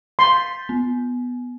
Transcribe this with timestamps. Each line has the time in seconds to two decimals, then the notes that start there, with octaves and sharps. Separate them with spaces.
0.19 C6 G6 A6 B6
0.69 B3